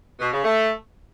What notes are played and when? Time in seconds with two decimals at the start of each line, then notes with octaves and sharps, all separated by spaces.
0.20 B2
0.32 C#3
0.43 A3